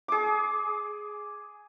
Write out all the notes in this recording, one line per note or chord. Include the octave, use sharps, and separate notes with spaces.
G#4 D6